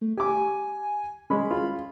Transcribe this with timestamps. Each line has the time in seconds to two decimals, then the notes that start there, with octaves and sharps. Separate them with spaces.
0.01 A3
0.17 G4 G#5 D6
1.30 G#3 C#4 B5
1.51 F4